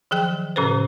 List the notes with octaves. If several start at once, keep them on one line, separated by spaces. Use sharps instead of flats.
D#3 F3 F#3 G#4 G5 F#6
A2 C#3 C#4 A4 B4 C5